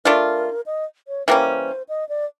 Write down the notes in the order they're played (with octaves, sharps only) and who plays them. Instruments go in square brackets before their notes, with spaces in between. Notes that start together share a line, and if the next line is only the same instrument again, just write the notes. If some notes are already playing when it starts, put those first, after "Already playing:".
[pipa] A3 D4 F4 [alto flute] A#4
[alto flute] D#5
C#5
[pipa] E3 G3 A#3 C#4 [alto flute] C5
[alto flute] D#5
D5